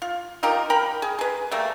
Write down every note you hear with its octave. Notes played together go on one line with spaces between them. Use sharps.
F4
D#4 F4 G4 A#4
A#4 G5 A#5 B5
G#4
G#4 B4
G3 A3 A#3